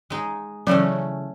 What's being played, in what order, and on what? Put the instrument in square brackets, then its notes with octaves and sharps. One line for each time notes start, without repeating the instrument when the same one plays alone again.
[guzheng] G#3 D#4 G#4
[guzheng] C#3 E3 A3 C#4 [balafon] F#3